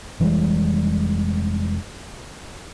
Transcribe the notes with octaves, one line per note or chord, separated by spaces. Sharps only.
F1 E3 G3 G#3